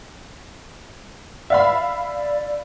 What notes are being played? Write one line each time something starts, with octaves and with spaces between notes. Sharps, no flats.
D5 E5 F5 B5